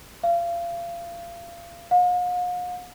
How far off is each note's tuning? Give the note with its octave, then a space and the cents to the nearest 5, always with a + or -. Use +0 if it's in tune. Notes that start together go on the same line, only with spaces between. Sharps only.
F5 -30
F5 +45